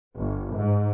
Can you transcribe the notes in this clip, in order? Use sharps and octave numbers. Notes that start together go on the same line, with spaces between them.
G1
G#2